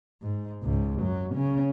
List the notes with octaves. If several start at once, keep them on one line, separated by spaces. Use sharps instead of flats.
G#2
C#2 G#2
F#2 F#3
C#3 C#4